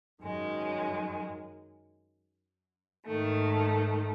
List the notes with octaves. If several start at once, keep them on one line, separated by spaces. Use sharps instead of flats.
F#2 D#3 G#3
G#2 D#3 A3